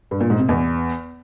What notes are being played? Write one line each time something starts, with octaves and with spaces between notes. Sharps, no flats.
G2
A#2
G#2
C3
E2